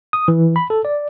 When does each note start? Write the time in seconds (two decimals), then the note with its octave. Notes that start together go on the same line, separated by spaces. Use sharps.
0.13 D#6
0.28 E3
0.56 B5
0.70 A4
0.85 D5